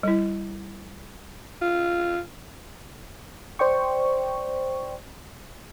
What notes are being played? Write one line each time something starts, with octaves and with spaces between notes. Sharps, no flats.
G3 E4
F4
C5 D5 G5 C#6